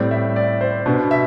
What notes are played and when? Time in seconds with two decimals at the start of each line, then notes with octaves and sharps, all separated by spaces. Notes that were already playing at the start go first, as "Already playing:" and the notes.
Already playing: A2 G3 C4 D5
0.11 E5
0.36 D5
0.61 C5
0.86 B2 B3 D4
1.11 E5